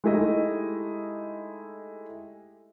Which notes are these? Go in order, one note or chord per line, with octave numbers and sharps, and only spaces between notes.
G#3 A3 D#4 E4 G4 D#5